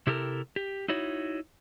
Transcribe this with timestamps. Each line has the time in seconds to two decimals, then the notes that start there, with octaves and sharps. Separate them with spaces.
0.07 C3 E4 G4 A4 A#4
0.56 G4
0.88 D#4 E4 F#4 C#5